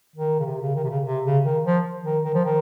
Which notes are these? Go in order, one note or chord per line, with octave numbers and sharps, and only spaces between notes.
D#3
C#3
C3
C#3
D#3
C3
C#3
C3
C#3
D#3
F3
D#3
D#3
F3
D#3